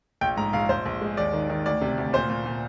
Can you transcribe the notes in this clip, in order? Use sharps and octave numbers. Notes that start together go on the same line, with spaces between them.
A#1 G5
G#2 A#5
A#1 F5
A#1 C5
A#1
G#3
D#2 D5
D#3
D#3
D2 D5
C3
D2
A#2 C5
A#2
A#2